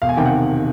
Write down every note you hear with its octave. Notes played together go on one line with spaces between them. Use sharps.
E1 F5
G#5
C3 D#3 G5
F#5